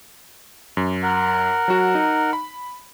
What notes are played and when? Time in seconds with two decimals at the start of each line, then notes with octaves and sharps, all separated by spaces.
0.77 F#2
1.03 A#4 F#5
1.68 F#3 F#4
1.95 D#4
2.33 B5